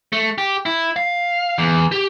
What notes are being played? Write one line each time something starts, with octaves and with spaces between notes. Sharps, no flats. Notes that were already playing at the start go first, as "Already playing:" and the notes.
A3
G4
E4
F5
E2
G4